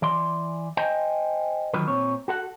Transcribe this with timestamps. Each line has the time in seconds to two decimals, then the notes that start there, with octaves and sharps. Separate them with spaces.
0.02 E3 D5 C6
0.77 C5 D#5 G5 G#5
1.74 D3 D#3 F3 F#3 B4
1.88 A#2 C4 C#5
2.28 F#4 A4 F#5